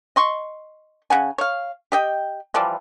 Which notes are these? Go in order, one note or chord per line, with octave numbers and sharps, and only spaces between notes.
D#5 C6 C#6
C#3 F#5 G#5
C#5 F5
G4 D#5 G5
E3 F3 G3 D5